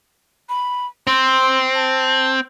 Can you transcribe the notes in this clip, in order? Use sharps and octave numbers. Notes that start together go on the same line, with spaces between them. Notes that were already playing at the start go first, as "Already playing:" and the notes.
B5
C4 C6
A5